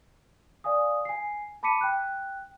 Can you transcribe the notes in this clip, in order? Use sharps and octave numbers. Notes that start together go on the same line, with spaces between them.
D5 F5 G#5 D#6
G#5 C7
A5 B5 D6 B6 C#7 D#7
G5 F#6